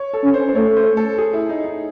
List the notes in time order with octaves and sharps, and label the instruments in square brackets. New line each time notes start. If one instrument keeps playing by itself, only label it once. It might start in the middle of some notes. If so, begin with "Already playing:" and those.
Already playing: [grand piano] C#5
A4
[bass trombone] C#4
[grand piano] C5
C5
[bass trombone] A3 [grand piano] C#5
[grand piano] C5
A4
G#4
E4
D#4
D#4